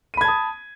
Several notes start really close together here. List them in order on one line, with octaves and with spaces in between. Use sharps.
D#7 B5 G#6 A5 D#6